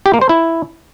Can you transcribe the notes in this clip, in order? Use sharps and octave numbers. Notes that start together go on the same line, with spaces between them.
G4
A#3
C5
E4